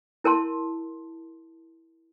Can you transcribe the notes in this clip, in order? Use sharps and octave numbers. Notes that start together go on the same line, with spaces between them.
E4 A#4 A5 C6